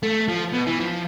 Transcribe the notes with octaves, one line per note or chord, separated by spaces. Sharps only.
A3
F3
B2
E3
F3